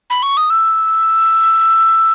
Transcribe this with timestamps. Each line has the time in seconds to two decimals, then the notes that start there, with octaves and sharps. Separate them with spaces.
0.10 B5
0.23 C#6
0.37 D#6
0.50 E6